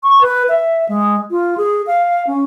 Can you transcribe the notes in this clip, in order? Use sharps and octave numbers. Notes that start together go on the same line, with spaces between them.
C#6
B4
E5
G#3
F4
G#4
F5
C#4